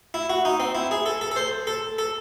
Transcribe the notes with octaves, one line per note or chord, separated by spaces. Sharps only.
E4
F#4
D#4
C4
E4
G#4
A4
A4
A4
C5
A4
A4